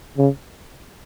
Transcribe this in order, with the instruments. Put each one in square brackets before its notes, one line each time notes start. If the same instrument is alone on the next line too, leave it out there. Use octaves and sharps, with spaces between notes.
[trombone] C#3